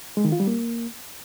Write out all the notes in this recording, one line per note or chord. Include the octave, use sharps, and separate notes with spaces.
G#3
D#3
F4
G3
A#3